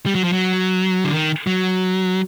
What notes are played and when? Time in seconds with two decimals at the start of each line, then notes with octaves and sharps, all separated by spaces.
0.06 G3
0.15 F#3
0.24 F3
0.33 F#3
1.04 D3
1.13 D#3
1.47 F#3